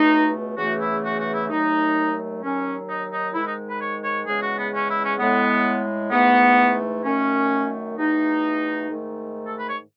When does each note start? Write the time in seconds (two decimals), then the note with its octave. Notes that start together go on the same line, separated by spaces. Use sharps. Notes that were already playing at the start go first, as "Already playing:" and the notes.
Already playing: C#2 B2 A3 D#4
0.57 E2 C#3 E3 A3 F#4
0.80 E4
1.04 F#4
1.19 F#4
1.34 E4
1.50 D#2 D#3 F#3 A3 D#4
2.42 D#2 D#3 F#3 C#4
2.88 D#4
3.12 D#4
3.34 G#2 D#3 G#3 E4
3.46 D#4
3.69 B4
3.81 C#5
4.04 C#5
4.27 E2 C#3 G#3 G#4
4.42 F#4
4.58 B3
4.73 C#4
4.89 E4
5.04 C#4
5.19 A2 G#3 B3
6.11 G#2 E3 A3 B3
7.04 F#2 D#3 A3 C#4
7.97 E2 B2 A3 D#4
8.89 G#2 D#3 A3
9.46 A4
9.58 B4
9.69 C#5